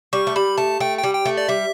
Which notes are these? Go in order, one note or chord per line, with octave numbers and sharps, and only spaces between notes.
G3 C#6
A3
G3 B5
A3 A5
A3 G5
G5
G3
G5
A3
D5
G3 E5